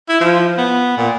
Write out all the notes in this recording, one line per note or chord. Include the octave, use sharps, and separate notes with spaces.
E4
F3
B3
A#2